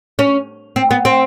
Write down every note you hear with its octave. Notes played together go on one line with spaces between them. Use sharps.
C#4
C4
B3
C4